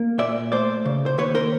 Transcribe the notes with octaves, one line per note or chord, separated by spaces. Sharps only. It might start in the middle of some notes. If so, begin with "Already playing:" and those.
Already playing: A#3
A#2 D5 E5
A3 C5 D5
C#3
C5
D#2 B4 C#5
A#4 C5